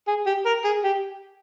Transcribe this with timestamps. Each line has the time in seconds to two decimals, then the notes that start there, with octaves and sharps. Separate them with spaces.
0.08 G#4
0.26 G4
0.46 A#4
0.65 G#4
0.84 G4